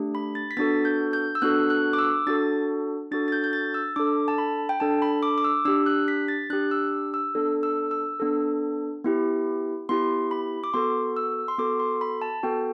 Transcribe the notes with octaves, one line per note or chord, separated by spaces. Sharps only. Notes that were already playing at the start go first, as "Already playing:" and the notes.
Already playing: A3 D4 G4
B5
A6
B6
B3 D4 F#4 A4 A6
G6
G6
E6
B3 D4 F#4 A4 F#6
F#6
D6
E6
D4 F#4 A4 A6
D4 F#4 A4 A6
A6
G6
G6
A6
E6
D4 A4 D6
A5
B5
G5
D4 A4 A5
B5
D6
D6
E6
D4 G4 E6
F#6
B6
A6
D4 G4 F#6
E6
E6
B3 D4 A4
E6
E6
B3 D4 A4
B3 E4 G4
B3 E4 G4 C6
B5
D6
B3 F#4 A4 C6
E6
C6
B3 F#4 A4 D6
C6
B5
A5
B3 F#4 A4 G5